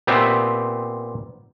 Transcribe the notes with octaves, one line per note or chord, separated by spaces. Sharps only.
A#2 B3 C4 G4 E5